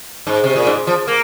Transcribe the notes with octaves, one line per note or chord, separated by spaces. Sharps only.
G#2
C3
A#2
G#2
F3
A#3